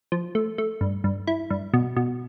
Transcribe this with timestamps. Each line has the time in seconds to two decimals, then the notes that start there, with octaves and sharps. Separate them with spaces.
0.12 F3
0.35 A3
0.58 A3
0.81 G2
1.04 G2
1.27 E4
1.50 G2
1.74 B2
1.97 B2